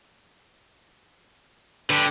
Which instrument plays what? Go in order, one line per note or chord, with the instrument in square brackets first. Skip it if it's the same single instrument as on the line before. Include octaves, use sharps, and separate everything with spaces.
[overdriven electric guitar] D3 [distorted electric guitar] G4 B4